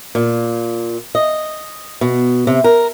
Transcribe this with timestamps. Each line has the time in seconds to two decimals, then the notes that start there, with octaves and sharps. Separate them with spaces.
0.15 A#2
1.15 D#5
2.01 B2
2.47 C3
2.64 A#4